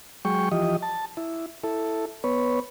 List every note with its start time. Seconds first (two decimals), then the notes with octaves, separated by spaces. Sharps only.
0.25 F#3 G#3 G5 C#6
0.52 E3 F3 G4 D#5
0.82 A5
1.17 E4
1.64 E4 A4
2.24 B3 B4 C#5